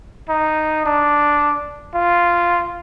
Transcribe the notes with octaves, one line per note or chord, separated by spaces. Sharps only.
D#4
D4
F4